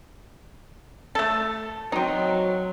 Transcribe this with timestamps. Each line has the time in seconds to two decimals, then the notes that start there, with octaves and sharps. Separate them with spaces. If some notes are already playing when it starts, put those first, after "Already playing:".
1.15 A3 A4
1.92 F#3 C4 D#4